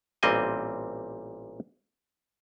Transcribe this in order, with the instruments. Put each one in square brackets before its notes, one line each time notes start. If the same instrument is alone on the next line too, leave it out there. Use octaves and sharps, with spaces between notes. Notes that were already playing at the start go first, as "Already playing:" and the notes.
[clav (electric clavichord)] A1 A#2 G3 C4 D#5 G#5